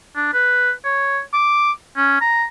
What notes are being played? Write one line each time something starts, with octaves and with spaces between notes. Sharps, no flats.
D4
B4
C#5
D6
C#4
A#5